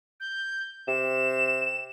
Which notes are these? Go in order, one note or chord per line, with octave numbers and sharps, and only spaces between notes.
G6
C3 E7